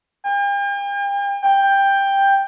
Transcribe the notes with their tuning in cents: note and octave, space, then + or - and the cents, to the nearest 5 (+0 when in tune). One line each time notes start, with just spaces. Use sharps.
G5 +45
G5 +10